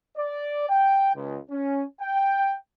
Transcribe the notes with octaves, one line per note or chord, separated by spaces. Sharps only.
D5
G5
C#2
C#4
G5